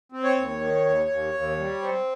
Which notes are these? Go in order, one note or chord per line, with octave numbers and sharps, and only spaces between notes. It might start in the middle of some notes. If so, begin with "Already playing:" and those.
C4
C#5
D#2
D#3
D#2
D#2
D#2
G3
C4